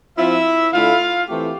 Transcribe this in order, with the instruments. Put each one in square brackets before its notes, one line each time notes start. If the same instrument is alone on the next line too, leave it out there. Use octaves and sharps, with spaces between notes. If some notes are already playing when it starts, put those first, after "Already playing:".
[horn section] F3 C4 E4 F4 E5
D3 A3 E4 F4 F5
E3 A3 C4 G4